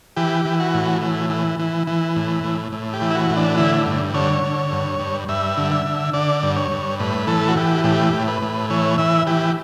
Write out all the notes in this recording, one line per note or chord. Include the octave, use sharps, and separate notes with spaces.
E3 G4
E3
F#4
A2
E3
E3
E3
E3
A2
A2
A2
G4
E3
E4
F#4
A2
D4
D3 E4
G2
D3 C#5
D3
G2
G2
G2 E5
D3
E5
D3
D3 D5
G2
C#5
G2
A2 B4
E3 A4
F#4
E3 G4
A2 G4
A2
B4
A2
E3 C#5
E3 E5
E3 G4